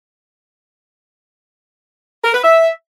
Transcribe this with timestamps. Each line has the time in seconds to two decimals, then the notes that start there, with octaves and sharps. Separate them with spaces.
2.24 A#4
2.34 B4
2.44 E5